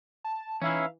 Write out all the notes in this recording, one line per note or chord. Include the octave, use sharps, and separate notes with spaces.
A5
E3 C#4 D#4 E4 E5 F5